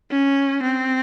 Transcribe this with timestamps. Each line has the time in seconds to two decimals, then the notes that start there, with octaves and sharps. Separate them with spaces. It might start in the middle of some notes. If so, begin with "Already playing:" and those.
0.11 C#4
0.63 C4